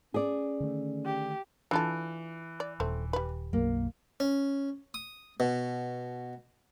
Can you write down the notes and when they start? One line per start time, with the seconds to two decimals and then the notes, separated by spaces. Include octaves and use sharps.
0.14 C#4 G#4 D5
0.60 D3 D#3 A3
1.05 G4
1.71 E3 D4 F4 A4
2.60 D5
2.80 D#1 A3 C4
3.13 G3 B4
3.53 B1 F#2 A#3
4.20 C#4
4.94 D#6
5.40 B2